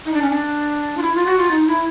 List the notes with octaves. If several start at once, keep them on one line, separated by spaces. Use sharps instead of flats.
D#4
D4
C#4
D4
F4
E4
F4
F#4
F4
D#4
E4